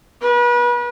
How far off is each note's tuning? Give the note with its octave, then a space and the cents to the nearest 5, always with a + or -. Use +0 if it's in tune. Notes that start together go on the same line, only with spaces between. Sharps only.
B4 -35